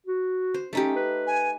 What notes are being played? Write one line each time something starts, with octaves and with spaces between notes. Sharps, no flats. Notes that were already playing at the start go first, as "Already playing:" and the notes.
F#4
C5
A3 C#4 D#4 G4
B4
G#5